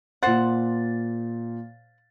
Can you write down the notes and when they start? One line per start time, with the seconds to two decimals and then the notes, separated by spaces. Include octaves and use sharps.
0.23 A#2 C5 F#5 A6